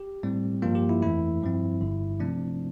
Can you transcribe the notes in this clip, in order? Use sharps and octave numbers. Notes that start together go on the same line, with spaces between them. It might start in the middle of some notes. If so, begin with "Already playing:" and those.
Already playing: G4
A2 G3 C4
G2 F3 A#3 F4
G4
E4
F2 E3 A3 E4
G2 F3 C4
G1 G2 D3
C3 F3 A3 C4 D4